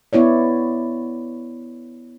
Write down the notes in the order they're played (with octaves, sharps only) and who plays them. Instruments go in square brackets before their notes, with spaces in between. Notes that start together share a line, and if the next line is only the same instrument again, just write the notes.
[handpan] B3 E4 C#5 D5